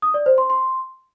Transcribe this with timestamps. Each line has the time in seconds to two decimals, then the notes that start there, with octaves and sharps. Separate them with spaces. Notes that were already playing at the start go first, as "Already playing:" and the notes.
0.02 D#6
0.14 D5
0.26 C5
0.38 C6
0.50 C6